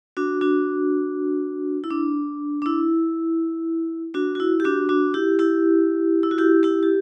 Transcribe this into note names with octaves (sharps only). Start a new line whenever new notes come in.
D4 F#4
D4 F#4
E4
D4
D4
E4
D4 F#4
F#4
E4
G4
D4 F#4
D4 F#4
E4 G4
E4 G4
E4
F#4
E4 G4
E4 G4
G4